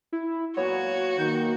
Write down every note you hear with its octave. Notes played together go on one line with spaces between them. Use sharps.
E4
A#2 F#3 B3 F#4 C#5
D#3 A#3 G6